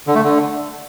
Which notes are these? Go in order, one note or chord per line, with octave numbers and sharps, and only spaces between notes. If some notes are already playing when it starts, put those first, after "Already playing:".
D3
A3
D3